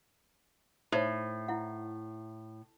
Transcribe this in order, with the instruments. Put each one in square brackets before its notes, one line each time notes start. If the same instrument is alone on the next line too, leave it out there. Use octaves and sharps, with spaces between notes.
[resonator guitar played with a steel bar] A2 [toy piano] D#4 C5 C#5
[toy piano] E4 F#5